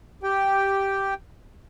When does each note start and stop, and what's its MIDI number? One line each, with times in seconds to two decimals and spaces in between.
0.23 1.14 67
0.23 1.14 79